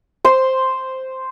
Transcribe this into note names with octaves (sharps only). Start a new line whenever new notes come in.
C5 C6